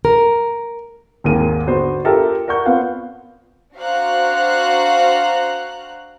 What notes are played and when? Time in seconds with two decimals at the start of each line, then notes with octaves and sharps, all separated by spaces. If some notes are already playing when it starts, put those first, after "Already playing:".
0.05 A#4
1.24 G#1 D#2 G#3 A#4 D#7
1.66 D3 B3 D4 F#4 C5
2.05 F4 G4 A4 A#4 E5 G5
2.48 A#4 D5 F#5 C#6 G6
2.66 B3 C4 F4 B4 F5 F#5
3.75 D4 F#4 C5 F5 A#5 F#6